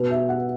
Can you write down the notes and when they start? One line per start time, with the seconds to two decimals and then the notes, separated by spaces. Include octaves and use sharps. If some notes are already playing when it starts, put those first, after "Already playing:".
Already playing: B2 B4
0.10 E5
0.28 F#5